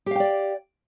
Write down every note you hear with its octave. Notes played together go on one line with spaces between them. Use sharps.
G4 D5 F5 G5